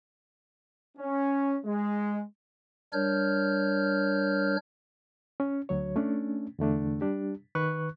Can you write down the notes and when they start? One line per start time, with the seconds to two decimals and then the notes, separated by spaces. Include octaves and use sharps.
0.98 C#4
1.65 G#3
2.93 G3 D4 A#4 C#5 F6 G6
5.40 C#4
5.69 D2 F#3 C#5
5.96 A3 C#4 D4
6.59 E2 D3 A3 D4
7.01 G3 D4 G4
7.55 D#3 B4 C#6 F#6